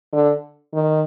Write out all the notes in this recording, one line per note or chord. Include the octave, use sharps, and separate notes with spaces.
D3
D#3